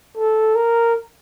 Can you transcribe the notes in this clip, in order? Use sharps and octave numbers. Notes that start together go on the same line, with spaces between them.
A4
A#4